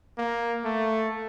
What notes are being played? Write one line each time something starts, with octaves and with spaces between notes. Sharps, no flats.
A#3
A3